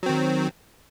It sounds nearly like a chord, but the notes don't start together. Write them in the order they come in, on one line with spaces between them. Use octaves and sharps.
F#3 C4 D#3